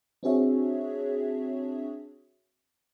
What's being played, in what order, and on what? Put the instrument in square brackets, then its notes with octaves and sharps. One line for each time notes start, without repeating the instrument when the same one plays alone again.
[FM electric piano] C4 D4 F#4 G#4 C#5 E5